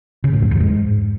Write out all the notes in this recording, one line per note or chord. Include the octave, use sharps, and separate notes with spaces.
C#3
A2
F2
E2
G#2